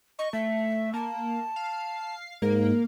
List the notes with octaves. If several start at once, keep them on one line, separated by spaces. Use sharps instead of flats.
D#5 C#6
A3 E5
A#3 A5
F5
G#2 A#3 A#4